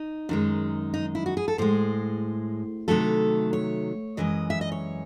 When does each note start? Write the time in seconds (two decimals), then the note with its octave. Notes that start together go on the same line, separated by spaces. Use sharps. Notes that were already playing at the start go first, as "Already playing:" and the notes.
Already playing: D#4
0.29 F#2 D#3 G#3
0.94 D#4
1.15 E4
1.26 F#4
1.37 G#4
1.48 A4
1.58 A2 G#3 C5
2.88 C3 D#3 F#3 A3 A4
3.53 C#5
4.17 F#2 E3 G#3 D#5
4.50 E5
4.61 D#5
4.72 C#5